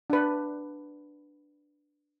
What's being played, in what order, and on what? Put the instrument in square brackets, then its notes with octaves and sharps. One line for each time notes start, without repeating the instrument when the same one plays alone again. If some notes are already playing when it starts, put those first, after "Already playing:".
[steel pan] D4 B4